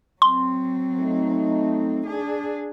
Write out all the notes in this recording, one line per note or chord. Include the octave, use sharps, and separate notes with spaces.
F#3 C4 C6
A3 D#4
D4 G#4